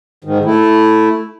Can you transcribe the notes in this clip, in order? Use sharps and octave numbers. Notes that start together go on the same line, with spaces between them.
G#2 D#3
A3 E4